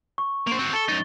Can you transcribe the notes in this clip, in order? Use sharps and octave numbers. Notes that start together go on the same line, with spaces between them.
C#6
A#3 C5
C4 F#4
A4 A6 G7
F#2 D#4 A6